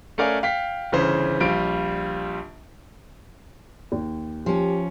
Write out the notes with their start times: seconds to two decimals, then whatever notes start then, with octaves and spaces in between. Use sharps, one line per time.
0.18 A3 C#4 A#4 D5 F5 G#5
0.43 F5 G5 B6
0.92 G1 C#3 E3 C#4 C5
1.40 A#1 G3 F4 D7
3.92 D#2
4.46 F3 C#4 G4